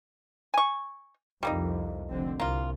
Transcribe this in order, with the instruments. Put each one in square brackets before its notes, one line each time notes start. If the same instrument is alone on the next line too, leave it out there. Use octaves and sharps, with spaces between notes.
[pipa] G#5 C#6
[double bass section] C2 F2 [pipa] G3 A#3 D#4
[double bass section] F1 D3 C4
[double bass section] C2 [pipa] A#3 F4